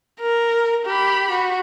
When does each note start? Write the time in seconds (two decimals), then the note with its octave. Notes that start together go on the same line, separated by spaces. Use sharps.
0.21 A#4
0.86 G4 B5
1.30 F#4